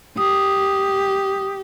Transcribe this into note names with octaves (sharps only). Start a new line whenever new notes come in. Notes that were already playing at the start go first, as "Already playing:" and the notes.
G4 D#6